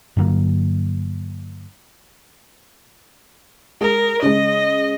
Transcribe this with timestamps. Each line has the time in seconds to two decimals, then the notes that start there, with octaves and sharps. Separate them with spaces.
0.17 G2 D3 F#3 A#3
3.81 G#3 G#4 A#4
4.22 C#3 G#3 D#5